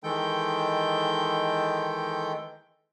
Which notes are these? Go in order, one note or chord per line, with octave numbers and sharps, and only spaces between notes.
D#3 E3 G#3 A4 G5 G6